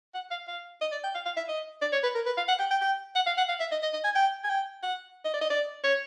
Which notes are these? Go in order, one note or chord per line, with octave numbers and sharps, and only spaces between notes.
F#5
F5
F5
D#5
D5
G5
F5
F5
E5
D#5
D5
C#5
B4
A#4
B4
F5
F#5
G5
G5
G5
F#5
F5
F#5
F5
E5
D#5
D#5
D#5
G#5
G5
G#5
G5
F#5
D#5
D5
D#5
D5
C#5